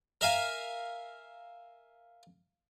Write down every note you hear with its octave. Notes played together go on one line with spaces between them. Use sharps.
A#4 E5 F5 G#5